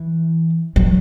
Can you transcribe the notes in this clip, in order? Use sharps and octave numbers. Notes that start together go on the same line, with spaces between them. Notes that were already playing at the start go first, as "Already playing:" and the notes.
Already playing: E3
F#3